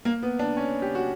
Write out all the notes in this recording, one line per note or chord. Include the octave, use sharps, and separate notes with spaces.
A#3
B3
D4
C#4
G4
F#4